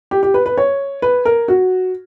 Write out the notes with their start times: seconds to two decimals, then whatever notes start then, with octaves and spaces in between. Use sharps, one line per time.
0.11 G4
0.23 G4
0.34 B4
0.46 B4
0.58 C#5
1.02 B4
1.25 A#4
1.48 F#4